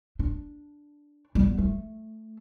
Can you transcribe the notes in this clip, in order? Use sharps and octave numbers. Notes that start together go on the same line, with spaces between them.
D4
G3 B3
A3